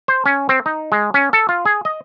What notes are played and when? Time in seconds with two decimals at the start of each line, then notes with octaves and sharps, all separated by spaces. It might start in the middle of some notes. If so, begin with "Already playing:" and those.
0.08 C5
0.26 C#4
0.49 C4
0.66 D#4
0.92 G#3
1.14 C#4
1.33 A4
1.49 F4
1.65 G#4
1.85 D#5